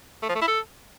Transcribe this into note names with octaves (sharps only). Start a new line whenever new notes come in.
A3
F3
A3
E4
A4